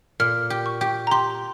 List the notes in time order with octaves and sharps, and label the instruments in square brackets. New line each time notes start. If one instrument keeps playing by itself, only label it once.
[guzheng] A#2 [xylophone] F6
[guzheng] G4
[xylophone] C#6
[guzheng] G4
[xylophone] A#5
[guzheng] G4 [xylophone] C6